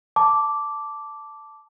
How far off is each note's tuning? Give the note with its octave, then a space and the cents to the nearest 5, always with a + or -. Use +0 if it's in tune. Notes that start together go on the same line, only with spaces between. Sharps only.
A5 +0 D6 -10